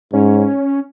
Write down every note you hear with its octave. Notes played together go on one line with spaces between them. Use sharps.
G#2 C#4